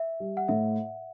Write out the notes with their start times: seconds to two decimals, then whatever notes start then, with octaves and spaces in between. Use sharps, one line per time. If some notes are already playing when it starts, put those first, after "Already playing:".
Already playing: E5
0.20 G3
0.37 F#5
0.48 A2 E5